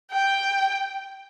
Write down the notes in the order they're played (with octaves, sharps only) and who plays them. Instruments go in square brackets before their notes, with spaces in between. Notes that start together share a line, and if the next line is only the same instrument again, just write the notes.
[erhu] G5